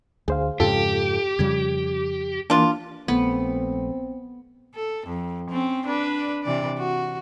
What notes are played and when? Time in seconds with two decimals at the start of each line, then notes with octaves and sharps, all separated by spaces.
0.28 D2 G#4 C5 F5
0.60 F2 G#2 C#3 F4 G4 A4
1.39 F2 C#3 G3 G#6
2.50 E3 A#3 D4 F4
3.08 A#1 A3 B3 C4
4.75 A4
5.07 F2
5.50 C4 C#4
5.87 D4 B4 D5
6.44 C3 E3 D5
6.78 F#4